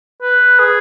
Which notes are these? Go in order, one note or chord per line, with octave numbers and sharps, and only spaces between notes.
B4
G#4